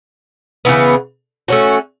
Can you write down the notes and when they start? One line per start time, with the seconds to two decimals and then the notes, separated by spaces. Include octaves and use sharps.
0.65 C#3 E3 B3
1.48 A3 C#4 F#4